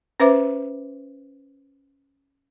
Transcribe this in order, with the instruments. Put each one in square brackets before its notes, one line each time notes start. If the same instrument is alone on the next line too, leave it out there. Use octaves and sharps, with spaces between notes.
[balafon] C#4 B4 C5 E5 D6